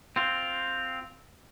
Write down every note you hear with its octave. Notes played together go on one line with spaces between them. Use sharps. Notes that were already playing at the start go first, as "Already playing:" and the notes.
C4 F4